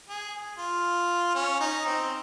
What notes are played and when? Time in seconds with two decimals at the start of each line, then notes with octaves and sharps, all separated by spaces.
0.09 G#4
0.59 F4
1.35 C#4
1.61 D#4
1.86 C4